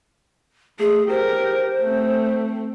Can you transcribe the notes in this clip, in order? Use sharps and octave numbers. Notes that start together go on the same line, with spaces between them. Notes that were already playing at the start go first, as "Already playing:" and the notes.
A3 G#4
G4 A#4 C5
A3 C4